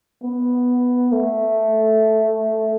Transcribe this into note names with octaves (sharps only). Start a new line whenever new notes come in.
B3
A3